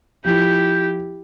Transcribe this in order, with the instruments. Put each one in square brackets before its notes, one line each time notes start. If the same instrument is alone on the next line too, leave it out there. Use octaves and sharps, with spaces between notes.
[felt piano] F3 [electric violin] E4 G4 [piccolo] G6